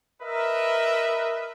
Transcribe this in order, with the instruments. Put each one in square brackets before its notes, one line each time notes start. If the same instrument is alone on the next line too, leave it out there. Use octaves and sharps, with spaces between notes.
[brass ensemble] A#4 B4 D#5 E5